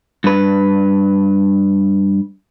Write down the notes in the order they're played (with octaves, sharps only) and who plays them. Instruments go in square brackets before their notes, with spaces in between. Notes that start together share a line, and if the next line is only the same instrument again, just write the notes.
[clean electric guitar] G2 B4